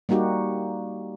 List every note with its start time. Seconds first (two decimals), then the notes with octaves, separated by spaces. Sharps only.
0.09 G3 A#3 D#4 F#4 G4